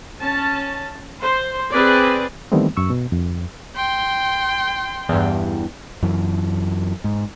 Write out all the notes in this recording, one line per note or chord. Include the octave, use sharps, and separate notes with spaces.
C#4 A5
C5
C4 G#4 B4 D5
D#3 E3 G3 A3 B3 C4
F#2 C#6 E6
B2
F2
G5 C6
E2 G2
F#2 E3
G#2